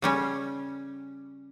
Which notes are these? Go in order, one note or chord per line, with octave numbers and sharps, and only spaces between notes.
C#3 G3 C#4